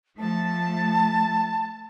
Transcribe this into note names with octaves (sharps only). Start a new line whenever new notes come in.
F3 A3 A5